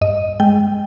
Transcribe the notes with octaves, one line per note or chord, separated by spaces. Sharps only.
G2 D#5
G#3 G5